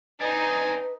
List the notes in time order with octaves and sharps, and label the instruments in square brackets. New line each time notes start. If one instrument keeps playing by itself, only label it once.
[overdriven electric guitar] C4 D4 [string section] D#4 [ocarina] B4 [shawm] G#5